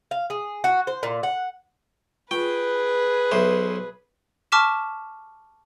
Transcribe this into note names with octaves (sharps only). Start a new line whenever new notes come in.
F5
G#4
F#4
C5
A#2
F#5
F4 G#4 B4 G5
B1 C5 E5
A5 C#6 D6 F6 B6 E7